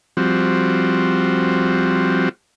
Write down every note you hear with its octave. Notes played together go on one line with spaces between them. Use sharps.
F3 G3 C4 F#4